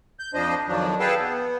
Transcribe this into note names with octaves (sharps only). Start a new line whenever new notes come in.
G6
F2 F3 D4 C5 D#5
F2 D#3 F3 F#3 D4
G#4 A4 B4 F5 G5 A5
B3